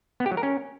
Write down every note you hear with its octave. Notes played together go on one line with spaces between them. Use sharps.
B3
G4
F#3
A#4
C#4